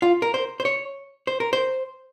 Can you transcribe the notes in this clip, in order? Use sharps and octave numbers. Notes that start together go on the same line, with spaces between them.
F4
A#4
C5
C5
C#5
C5
A#4
C5